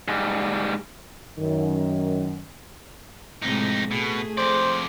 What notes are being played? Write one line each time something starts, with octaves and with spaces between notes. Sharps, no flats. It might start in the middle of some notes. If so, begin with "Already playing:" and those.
G#2 G3
F#2 D#3
F2 A2 C3 G#3 D#4
B2 A3 G#4
F2 C5 D5